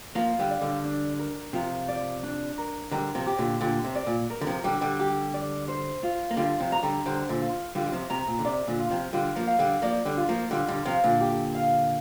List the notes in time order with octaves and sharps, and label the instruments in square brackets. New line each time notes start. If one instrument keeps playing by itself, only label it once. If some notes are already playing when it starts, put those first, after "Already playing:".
[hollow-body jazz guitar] F3 A#3 [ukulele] F4
[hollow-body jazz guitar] D3 G3
[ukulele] D5
[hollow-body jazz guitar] D3 G3
[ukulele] D4
A#4
[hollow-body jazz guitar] C3 F3 [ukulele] F4
[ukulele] D5
D4
A#4
[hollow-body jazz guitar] D3 G3 [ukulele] A#4
[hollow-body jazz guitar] C3 F3
[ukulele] G4
[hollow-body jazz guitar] A#2 D3
[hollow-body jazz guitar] A#2 D3 [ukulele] G4
[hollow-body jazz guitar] C3
[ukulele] D5
[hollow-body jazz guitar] A#2
[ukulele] A#4
[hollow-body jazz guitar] D3
C3 F3
[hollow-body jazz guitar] D3 G3 [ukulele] G4
[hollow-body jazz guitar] D3 G3
[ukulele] G4
D5
C5
F4
[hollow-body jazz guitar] A#3
[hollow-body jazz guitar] D3 G3 [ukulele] F4
[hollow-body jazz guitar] C3 F3
[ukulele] A#5
[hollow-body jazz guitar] D3 G3
[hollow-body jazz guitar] D3 G3 [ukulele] C5
[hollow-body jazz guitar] A#2 D3
[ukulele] F4
[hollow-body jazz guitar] D3 G3 [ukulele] F4
[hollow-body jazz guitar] G3
C3 F3
[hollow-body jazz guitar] C3 [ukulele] A#5
[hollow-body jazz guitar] A#2
D3
[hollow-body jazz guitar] C3 [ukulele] D5
[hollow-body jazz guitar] A#2 D3
[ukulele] F4
[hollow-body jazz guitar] C3 F3
[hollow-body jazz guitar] D3 G3 [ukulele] F4
[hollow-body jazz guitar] F3 A#3
[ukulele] F5
[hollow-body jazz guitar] D3 G3
[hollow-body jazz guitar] F3 A#3 [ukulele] D5
[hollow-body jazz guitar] D3 G3
[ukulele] F4
[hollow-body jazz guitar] F3 A#3
[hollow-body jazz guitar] D3 G3 [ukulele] F4
[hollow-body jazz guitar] D3 G3
[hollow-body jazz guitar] C3 F3 [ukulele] F5
[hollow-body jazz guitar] A#2 D3
[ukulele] G4
F5